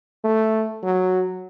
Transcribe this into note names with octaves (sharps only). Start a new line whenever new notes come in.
A3
F#3